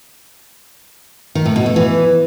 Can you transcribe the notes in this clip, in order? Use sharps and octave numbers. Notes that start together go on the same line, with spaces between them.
D#3
A2
B2
A3
E3